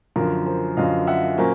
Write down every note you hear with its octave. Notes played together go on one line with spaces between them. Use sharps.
F#2 D3 F3 A#4
A#4 C5
F#2 D3 F3 D#5 F5
E5 F#5
A#2 F#3 A#3 C#4 A#4 C5